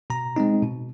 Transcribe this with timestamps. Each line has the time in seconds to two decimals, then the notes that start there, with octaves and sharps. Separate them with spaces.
0.10 B2 A#5
0.36 G#3 C4 D#4
0.62 B2